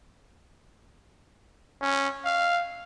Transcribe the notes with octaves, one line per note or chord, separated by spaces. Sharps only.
C#4
F5